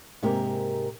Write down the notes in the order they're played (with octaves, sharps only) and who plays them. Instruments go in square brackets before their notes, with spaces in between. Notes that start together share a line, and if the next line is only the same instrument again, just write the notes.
[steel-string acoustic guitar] G#2 C3 A#3 G4 G#4 A#4